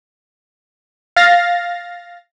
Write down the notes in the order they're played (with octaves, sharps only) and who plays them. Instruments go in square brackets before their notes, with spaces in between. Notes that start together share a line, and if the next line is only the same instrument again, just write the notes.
[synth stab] F5 A6 A#6